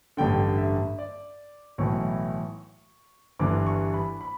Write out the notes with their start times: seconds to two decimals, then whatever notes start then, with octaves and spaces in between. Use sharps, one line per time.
0.17 A1 G2 D3 G5
0.58 E5
0.99 D5
1.78 B1 A2 E3 C#6
3.39 G1 G2 E3 D6
3.66 C#6
3.94 B5
4.21 B5